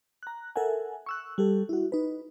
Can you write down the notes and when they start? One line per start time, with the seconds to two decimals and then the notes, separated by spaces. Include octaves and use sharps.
0.23 A#5 F#6
0.56 A4 A#4 E5 F#5 G#5
1.06 C#6 E6 F#6
1.38 G3 G4 A4
1.69 E4 F#4
1.92 D#4 B4